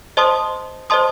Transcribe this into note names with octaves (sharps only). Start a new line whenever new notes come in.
C5 D#5 A5 C6 D#6
C5 D#5 A5 C6 D#6